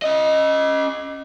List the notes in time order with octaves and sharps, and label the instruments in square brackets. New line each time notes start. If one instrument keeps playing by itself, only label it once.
[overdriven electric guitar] C#4 D#5